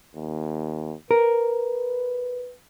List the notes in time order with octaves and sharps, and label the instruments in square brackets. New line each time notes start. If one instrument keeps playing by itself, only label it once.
[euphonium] D#2
[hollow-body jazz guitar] A#4 [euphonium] B4